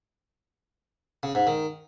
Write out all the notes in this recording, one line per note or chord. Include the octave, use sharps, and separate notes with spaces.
C#3
G#2
D#3